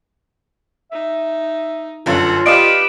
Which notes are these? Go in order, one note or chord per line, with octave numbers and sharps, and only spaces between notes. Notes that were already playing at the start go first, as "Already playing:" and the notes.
D#4 E5
G1 F#2 F4 A4 F#5
G4 B4 D5 D#5 F5 D7 E7